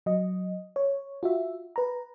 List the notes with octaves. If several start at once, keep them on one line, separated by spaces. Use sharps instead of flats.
F#3 D#5
C#5
F4 F#4 E5
B4 A#5